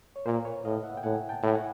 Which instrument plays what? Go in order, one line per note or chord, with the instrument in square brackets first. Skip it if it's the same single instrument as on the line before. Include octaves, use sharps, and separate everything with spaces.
[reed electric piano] C#5
[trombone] A#2 [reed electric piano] A#4 C5
[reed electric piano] B4 C#5
[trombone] A2 [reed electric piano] D#5 F5
[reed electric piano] E5 F#5
G5
[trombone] A2 [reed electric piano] F#5 G#5
[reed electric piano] G5 A5
[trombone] A2
[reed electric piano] F#5 G#5